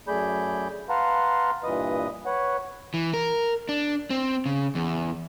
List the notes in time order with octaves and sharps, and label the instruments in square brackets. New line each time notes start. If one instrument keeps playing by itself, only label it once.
[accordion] F#2 A3 G#4 D5 B5 G6
B4 F5 F#5 A5 A#5 C6
G2 A#2 E3 B4 D#5 D#6
B4 C#5 F#5
[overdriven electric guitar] E3
A#4
D4
C4
C#3
E2